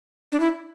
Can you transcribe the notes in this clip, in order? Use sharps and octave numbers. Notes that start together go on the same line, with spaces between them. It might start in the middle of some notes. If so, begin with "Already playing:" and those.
D4
E4